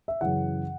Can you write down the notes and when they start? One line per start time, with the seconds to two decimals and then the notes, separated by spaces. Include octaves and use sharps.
0.08 E5
0.21 F#2 C#3 E3 F#5